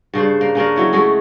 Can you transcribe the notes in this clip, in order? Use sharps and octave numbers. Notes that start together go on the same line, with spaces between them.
G2 C#3 D4 C5
A#3
C#3 C#4 D4 A#4
F#3 E4 C#5
G#3 A3 F#4 G#4